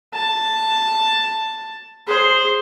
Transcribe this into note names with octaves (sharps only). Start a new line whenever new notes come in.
A5
G#4 C5